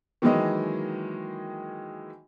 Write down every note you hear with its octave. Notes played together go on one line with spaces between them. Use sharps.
D#3 E3 F#3 G#3 A#3 D#5